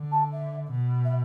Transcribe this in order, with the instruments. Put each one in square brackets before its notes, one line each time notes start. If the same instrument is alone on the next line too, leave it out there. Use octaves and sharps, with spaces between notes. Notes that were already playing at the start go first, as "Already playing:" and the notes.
Already playing: [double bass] D3
[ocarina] A5
E5
[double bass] B2
[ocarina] E5